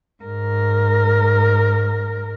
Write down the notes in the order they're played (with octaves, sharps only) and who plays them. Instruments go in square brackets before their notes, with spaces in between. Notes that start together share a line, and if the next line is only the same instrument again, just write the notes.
[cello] G#2 A#4